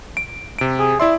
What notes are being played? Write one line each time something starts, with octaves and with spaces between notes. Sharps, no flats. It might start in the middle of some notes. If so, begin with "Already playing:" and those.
D7
C3 D7
G#4
E4 D5 E5 C6